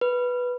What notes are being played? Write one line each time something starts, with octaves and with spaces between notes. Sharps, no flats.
B4